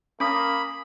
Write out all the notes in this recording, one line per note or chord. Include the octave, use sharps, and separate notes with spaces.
A#3 C#4 G#5 B5 D6 D#6